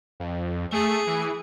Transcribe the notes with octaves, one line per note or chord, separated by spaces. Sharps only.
F2
A3 G#4
E3